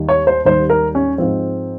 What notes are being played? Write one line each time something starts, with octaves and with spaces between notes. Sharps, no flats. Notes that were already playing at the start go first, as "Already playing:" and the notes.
Already playing: D#2 D#3 G3
C#5
C5
D#2 D#3 G3 C5
A#4
C#4
G#2 F3 C4